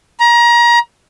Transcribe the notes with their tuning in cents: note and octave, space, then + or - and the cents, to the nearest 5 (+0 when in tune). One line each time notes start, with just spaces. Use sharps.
A#5 +30